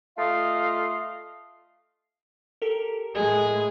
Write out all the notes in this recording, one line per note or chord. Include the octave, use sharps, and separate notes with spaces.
A3 F4 D#5 F5
G4 A4 A#4
A2 G#3 G#4